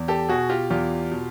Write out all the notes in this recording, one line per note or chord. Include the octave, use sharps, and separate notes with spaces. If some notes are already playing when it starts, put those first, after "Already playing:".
Already playing: E2
G4 A4
B2 F#4 G#4
F4 G4
E2 F4 G4
B2